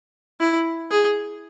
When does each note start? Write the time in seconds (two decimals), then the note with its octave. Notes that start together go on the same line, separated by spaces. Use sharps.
0.40 E4
0.91 G#4